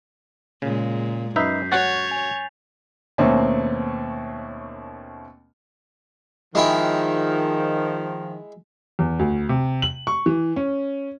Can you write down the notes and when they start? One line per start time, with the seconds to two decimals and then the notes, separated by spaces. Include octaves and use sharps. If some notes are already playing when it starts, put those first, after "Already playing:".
0.62 A#2 C#3 G#3
1.36 F#2 D#4 B4 E5 G6 B6 C7
1.71 C#4 F#4 C#5 F#5 A6
2.08 G#5 F7
3.18 D#2 B2 A3 A#3 C4 C#4
6.55 D#3 F3 G#3 E4 G5
8.99 E2
9.19 D2
9.49 C3
9.82 F#7
10.07 C#6
10.26 E3
10.56 C#4